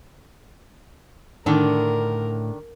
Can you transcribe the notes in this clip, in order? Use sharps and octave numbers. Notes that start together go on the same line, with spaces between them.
A2 D3 D#3 D4 A#4